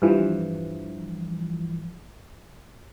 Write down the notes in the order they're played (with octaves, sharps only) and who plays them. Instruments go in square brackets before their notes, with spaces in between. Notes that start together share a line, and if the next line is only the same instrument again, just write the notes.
[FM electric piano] G2 E3 F3